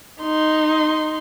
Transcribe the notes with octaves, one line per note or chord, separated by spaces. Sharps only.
D#4 C6